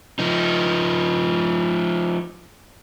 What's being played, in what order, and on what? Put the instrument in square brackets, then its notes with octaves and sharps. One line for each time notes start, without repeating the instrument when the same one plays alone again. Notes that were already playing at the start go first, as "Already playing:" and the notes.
[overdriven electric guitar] F3 D#4